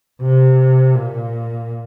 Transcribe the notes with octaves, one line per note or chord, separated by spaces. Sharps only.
C3
A#2